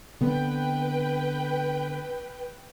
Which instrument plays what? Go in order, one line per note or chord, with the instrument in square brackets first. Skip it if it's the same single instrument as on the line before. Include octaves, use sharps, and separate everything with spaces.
[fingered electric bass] D3 B3 C4 [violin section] B4 G5